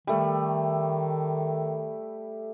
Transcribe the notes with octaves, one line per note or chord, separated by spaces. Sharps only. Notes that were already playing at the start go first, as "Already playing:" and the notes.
D#3 G3 A3